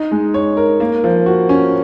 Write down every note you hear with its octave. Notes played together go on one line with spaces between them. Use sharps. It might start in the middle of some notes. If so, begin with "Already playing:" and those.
Already playing: D#4
G#3
C#5
A#4
A#3
F3
F#4
C#4